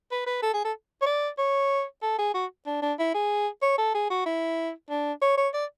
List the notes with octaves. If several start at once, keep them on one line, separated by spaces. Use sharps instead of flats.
B4
B4
A4
G#4
A4
C#5
D5
C#5
A4
G#4
F#4
D4
D4
E4
G#4
C#5
A4
G#4
F#4
E4
D4
C#5
C#5
D5